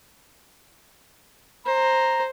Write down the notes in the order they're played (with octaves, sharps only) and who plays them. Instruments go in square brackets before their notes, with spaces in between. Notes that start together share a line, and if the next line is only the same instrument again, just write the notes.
[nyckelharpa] C5 [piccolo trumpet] A#5